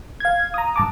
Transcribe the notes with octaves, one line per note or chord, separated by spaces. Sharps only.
F5 G#6
A#5 D#6
G2 A5 D6